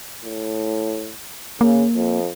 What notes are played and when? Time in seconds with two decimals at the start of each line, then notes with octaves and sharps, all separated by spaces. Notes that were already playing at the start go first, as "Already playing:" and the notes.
0.24 A2
1.61 C#3 A#3
1.95 F2